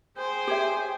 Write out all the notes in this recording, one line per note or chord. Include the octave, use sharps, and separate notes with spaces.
G#4 C5 G5 G#5
G4 C#5 E5